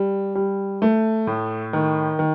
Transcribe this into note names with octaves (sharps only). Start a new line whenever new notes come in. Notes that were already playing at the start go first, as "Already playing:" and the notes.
Already playing: G3
G3
A3
A2
D#3
D#3